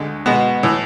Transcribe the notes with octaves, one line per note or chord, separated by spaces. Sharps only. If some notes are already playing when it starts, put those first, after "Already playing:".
Already playing: D2 D3 G#3
B2 G#3 B3 F#4
A2 E3